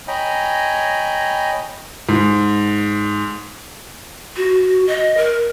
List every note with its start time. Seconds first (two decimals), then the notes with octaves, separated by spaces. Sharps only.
0.08 C#5 D#5 G5 G#5 A#5 B5
2.09 G#2
4.37 F#4
4.87 D#5
5.17 A#4